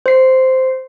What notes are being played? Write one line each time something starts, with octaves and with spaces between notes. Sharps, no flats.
C5 C7